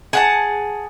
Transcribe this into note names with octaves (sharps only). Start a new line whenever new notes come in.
G#4 F#5 A5